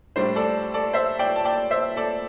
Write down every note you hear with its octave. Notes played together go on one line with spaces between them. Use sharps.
A2 G3 D4 C5
A4 D5
A4 D5
C5 E5
D5 G5
A5
D5 G5
C5 E5
A4 D5